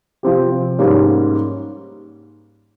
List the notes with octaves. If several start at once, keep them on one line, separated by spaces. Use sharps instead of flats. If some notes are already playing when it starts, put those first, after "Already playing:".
C3 F3 C4 G4
G#2 G3 A#3 C#4